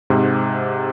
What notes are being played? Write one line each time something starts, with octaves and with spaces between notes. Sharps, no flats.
G#2 C3